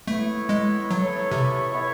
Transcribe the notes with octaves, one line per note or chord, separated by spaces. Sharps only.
A3 B3 E4 A4 C#5
G#3
F#3 B3 E4 A4 C#5
C3
B3 E4 A4 C#5